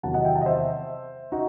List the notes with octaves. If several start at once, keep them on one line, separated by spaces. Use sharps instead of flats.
E2 C3 D#3 F#3 F#5 A5
D#5 F#5
E5 G5
F#5 A5
D#5
C5 E5
D#4 F#4